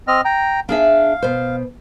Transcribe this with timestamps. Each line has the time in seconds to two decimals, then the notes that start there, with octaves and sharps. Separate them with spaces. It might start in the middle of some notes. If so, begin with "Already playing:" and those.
0.08 C4 D#5 F6
0.25 G5 A#5
0.69 D4 G#4 E5 F5
1.22 B2 C5